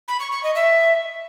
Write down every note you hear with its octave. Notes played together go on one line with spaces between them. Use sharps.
B5
C#6
C#6
D#5
E5